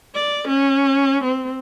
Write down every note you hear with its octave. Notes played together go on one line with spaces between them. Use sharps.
D5
C#4
C4